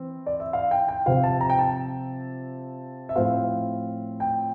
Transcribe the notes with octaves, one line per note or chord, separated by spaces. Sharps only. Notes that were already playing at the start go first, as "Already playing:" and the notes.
Already playing: E3 C4
D5
E5
F5
G5
G5
C3 F3 C4 F5
A5
A#5
G5
A5
E5
A2 F3 C4 F5
G5